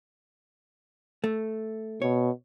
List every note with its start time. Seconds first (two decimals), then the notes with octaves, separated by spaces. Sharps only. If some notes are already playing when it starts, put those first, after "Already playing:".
1.24 A3
2.02 B2 C#5